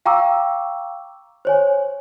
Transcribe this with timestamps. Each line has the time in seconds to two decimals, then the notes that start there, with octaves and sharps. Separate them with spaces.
0.06 F5 G5 A#5 C#6 D6 E6
1.45 C5 C#5 G#5